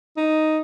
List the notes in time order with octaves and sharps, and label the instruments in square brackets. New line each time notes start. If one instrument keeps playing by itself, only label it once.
[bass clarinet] D#4